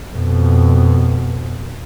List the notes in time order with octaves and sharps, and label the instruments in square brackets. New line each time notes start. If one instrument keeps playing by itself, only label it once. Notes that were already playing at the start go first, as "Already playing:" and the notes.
[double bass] F2 B2